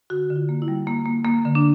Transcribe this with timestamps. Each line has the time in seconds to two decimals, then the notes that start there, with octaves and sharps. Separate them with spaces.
0.10 D3 F#4
0.30 D3
0.36 F4
0.49 A#3
0.62 E4
0.68 G3
0.87 A#3
1.06 A#3
1.25 A#3
1.45 D3
1.55 D4